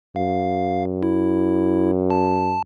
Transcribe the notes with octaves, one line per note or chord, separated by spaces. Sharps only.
F#2 F5
E4
A5